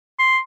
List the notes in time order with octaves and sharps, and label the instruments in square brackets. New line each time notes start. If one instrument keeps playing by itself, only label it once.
[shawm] C6